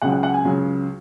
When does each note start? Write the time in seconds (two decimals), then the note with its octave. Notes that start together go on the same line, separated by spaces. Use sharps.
0.02 C#2 C#3 F#3 F#5
0.12 F#5
0.23 F#5
0.34 G#5
0.44 C#2 C#3 F#3